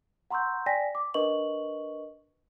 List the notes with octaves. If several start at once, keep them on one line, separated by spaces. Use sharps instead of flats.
F#5 A#5 C6 C#6 E6 G6
D5 G5 G#5 A#6 B6
D6
D4 A#4 B4 D#5 C#6 F#7